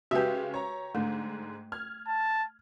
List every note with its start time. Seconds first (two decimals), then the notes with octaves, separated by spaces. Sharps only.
0.11 C#3 G#3 F#4 G4 B4 E5
0.54 C#5 A#5
0.95 G#2 D3 A3
1.72 F6 G#6
2.07 A5